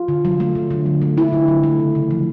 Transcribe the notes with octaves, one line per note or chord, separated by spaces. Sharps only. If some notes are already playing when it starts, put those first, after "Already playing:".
Already playing: F4
D3
F#3
A3
D3
D3
F#3
A3
D3 E4
D3
F#3
A3
C#3
C#3
F3